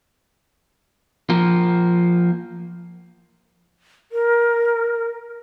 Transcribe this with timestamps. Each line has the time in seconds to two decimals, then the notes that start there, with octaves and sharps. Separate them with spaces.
1.30 F3 A#3
4.11 A#4